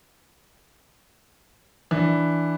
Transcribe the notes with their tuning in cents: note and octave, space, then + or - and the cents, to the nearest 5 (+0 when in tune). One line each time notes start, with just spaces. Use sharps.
E3 +0 D4 +0